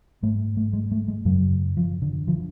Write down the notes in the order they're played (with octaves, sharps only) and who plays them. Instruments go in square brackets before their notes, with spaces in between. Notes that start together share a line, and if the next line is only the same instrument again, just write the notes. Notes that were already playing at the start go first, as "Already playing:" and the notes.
[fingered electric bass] G#2 A3
A3
G#3
A3
G#3
F#2 C#3 F#3
F3
D3
D3 F3